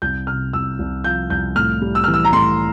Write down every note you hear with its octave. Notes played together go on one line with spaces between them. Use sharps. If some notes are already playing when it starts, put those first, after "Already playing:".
C2 G6
C3 F6
C2 E6
C2
F3 G6
C2 G6
A2 F6
G3
E6
E3 F6
E6
A#5
A2 C6